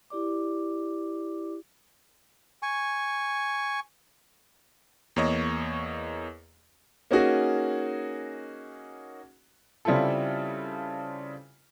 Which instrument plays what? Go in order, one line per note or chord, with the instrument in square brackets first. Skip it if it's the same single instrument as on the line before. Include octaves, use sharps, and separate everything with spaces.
[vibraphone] E4 G4 D5 D6
[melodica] G#5 C#6
[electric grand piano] E2 A#3 C#5 D#5 C#6
[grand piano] A#3 C#4 D#4 F#4 G#4
[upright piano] C#3 G3 C4 E4 F4 A4